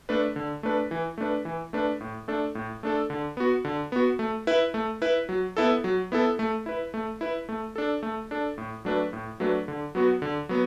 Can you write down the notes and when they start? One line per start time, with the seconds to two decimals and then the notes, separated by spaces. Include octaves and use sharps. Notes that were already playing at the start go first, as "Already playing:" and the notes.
0.09 A3 D4 B4
0.36 D3
0.63 A3 D4 B4
0.91 E3
1.18 A3 D4 B4
1.45 E3
1.73 A3 D4 B4
2.01 A2
2.28 A3 D4 A4
2.55 A2
2.83 A3 D4 A4
3.10 D3
3.37 B3 F#4
3.65 D3
3.92 B3 F#4
4.19 A3
4.47 E4 B4
4.74 A3
5.02 E4 B4
5.29 F#3
5.57 B3 E4 A4
5.84 F#3
6.12 B3 E4 A4
6.39 A3
6.66 E4 B4
6.94 A3
7.21 E4 B4
7.49 A3
7.76 D4 A4
8.03 A3
8.31 D4 A4
8.58 A2
8.85 F#3 A3 D4 B4
9.13 A2
9.40 F#3 A3 D4 B4
9.68 D3
9.95 F#3 B3 F#4
10.22 D3
10.49 F#3 B3